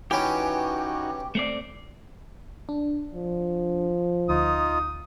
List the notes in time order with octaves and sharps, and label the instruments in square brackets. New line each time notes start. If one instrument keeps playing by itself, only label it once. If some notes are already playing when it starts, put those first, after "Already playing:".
[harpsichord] E3 C#4 [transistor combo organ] D#4 F#4 [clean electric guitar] G4
[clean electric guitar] A3 C4 D5
[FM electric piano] D4
[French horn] F3
[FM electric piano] D2 [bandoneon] D#4 F4 [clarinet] D#6